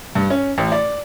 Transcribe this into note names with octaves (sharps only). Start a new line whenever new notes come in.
G2
C#4
A1
D5